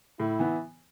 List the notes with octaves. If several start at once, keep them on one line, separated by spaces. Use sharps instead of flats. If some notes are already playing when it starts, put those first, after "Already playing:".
A2 E4
E3 B3